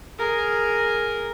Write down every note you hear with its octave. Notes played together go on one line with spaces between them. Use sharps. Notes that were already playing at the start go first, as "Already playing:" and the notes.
G#4 A#4